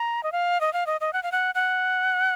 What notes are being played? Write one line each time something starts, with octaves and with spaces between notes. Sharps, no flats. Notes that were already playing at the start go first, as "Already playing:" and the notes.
Already playing: A#5
D#5
F5
D#5
F5
D#5
D#5
F#5
F5
F#5
F#5